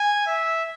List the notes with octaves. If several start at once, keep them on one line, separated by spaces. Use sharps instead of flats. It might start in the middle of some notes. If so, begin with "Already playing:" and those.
Already playing: G#5
E5